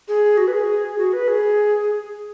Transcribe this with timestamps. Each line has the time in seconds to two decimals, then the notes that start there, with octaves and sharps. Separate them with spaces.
0.08 G#4
0.37 F#4
0.47 B4
0.53 G#4
0.98 F#4
1.13 B4
1.28 G#4